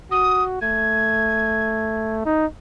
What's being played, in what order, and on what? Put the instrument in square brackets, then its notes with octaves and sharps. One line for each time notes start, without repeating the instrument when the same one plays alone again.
[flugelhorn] F#4 [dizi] D#6
[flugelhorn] A3 [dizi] G#6
[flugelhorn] D#4